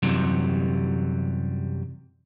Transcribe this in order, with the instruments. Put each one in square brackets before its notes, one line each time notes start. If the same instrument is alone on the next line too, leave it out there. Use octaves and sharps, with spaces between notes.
[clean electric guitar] F#2 C3 E3 F#3 G3